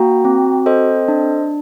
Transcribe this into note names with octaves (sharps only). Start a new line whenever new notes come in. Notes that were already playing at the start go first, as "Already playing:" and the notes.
Already playing: A#3 F#4 G5 A#5
C4
A4 C5 D#5
D4